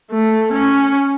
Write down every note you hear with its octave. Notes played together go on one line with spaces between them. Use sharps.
A3
C#4